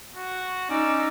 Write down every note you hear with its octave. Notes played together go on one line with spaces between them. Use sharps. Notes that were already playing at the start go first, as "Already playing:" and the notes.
F#4
C#4 D#4 D5 E6